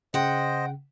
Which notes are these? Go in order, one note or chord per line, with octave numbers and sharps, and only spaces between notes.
C#3 C5 D#5 F#5 G5